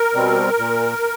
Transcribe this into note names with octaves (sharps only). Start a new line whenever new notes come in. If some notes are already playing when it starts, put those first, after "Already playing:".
Already playing: A#4
B2 G3 C4
A#2